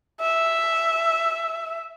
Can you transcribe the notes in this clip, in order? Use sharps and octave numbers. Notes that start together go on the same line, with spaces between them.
E5